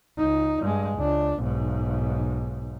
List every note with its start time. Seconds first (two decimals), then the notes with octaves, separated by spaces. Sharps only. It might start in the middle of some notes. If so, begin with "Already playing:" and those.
0.18 C#2 D#4
0.61 G2 G#3
0.98 C#2 D4
1.39 B1 G#2